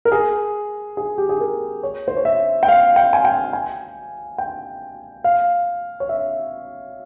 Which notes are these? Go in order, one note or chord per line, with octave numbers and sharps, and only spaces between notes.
A#4
G#4
G#4
G4
G#4
A#4
C#5
C5
C#5
E5
G5
F5
G5
G#5
G5
G#5
G5
F5
C#5
E5